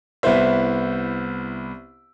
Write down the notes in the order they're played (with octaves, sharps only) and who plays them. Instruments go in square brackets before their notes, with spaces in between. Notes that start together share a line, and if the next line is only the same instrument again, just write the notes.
[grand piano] C2 B3 E4 C5 E5